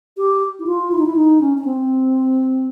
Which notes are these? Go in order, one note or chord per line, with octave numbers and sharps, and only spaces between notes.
G4
E4
F4
E4
D#4
E4
D#4
C#4
C#4
C4